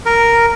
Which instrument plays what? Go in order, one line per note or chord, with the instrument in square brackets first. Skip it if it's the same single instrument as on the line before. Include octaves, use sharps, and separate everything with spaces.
[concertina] A#4